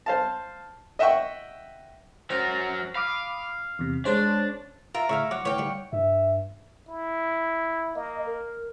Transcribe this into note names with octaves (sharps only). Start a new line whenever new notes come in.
C5 F5 A5
D#5 E5 F#5 G5 C#6
F#3 A#4 C5
F5 B5 D6 D#6
E2 C3
G#3 D4 C5 C#5
F4 A#4 E5
A2 C#3 E4 E5 F5 C#6 E6 F6
F#3 C#5 F#5 C#6 D6
E3 A3 C#5 F5 G5
D#3 G3
G2 E5
E4
A#3 D#5
A#4